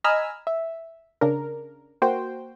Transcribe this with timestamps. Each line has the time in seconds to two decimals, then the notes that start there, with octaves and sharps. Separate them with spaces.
0.04 D#5 G#5 A#5 B5 E6 F6
0.47 E5
1.21 C#3 D4 A#4
2.02 A#3 F#4 C5 G5